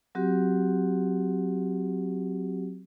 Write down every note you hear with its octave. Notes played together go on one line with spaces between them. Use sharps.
F#3 C4 F#4 G4